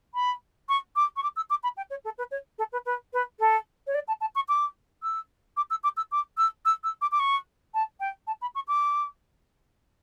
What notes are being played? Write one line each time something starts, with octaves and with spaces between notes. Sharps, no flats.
B5
C#6
D6
C#6
D6
E6
D6
B5
G5
C#5
A4
B4
C#5
A4
B4
B4
B4
A4
C#5
D5
A5
A5
C#6
D6
E6
D6
E6
D6
E6
D6
E6
E6
E6
D6
D6
C#6
A5
G5
A5
B5
C#6
D6